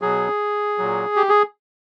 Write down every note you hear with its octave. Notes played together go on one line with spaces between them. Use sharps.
B2 F#3 G#4
A#2 F#3
G4
G#4